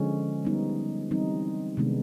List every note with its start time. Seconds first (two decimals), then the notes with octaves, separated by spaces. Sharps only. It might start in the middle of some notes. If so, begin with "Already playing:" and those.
Already playing: D3 F3 G#3 C#4
0.45 G3 B3 D#4
1.11 E3 G3 C4 D#4
1.77 C3 D#3 G#3 B3 D4